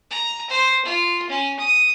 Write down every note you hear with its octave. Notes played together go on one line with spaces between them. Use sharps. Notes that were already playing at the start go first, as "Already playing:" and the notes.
A#5
C5
F4
C#4
D#6